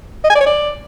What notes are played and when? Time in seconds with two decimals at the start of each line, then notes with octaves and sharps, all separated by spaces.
0.24 D#5
0.30 G#5
0.35 D5
0.41 C#5
0.46 D5